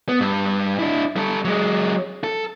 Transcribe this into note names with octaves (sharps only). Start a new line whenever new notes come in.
B3
G2
D4 E4
G3 A4
F#3 G#3
A4